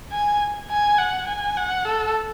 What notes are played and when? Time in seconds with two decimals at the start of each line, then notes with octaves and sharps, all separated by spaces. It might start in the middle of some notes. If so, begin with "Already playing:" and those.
0.12 G#5
0.70 G#5
0.99 F#5
1.28 G#5
1.57 F#5
1.85 A4